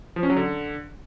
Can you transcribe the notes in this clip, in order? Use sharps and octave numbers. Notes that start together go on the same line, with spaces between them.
F3
C#4
F#3
D3